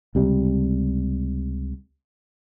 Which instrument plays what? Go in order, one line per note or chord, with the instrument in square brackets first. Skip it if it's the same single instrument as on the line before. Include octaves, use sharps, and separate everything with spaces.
[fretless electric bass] C#2 C3 G3